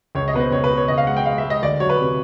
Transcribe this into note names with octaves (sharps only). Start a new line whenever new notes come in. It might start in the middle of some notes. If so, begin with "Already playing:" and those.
C#2 C#5
D#5
B2 B4
C5
C#2 C#5
B4
B2
C#5
C#2 D#5
F5
G#3 F#5
G5
G#3 F5
E5
G#3
D#5
D2 D5
F#3 C#5
B4
C3